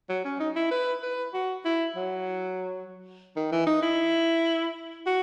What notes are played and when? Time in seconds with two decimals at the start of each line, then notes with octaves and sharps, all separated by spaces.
0.09 F#3
0.25 C#4
0.40 D#4
0.56 E4
0.71 B4
1.03 B4
1.34 F#4
1.65 E4
1.96 F#3
3.36 D#3
3.52 E3
3.67 D#4
3.82 E4
5.07 F#4